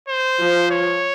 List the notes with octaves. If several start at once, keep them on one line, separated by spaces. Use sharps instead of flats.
C5
F3
C#5